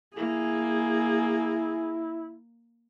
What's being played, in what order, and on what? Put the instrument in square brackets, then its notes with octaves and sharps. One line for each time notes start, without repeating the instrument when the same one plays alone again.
[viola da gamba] A#3 [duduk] E4 [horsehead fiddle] G#4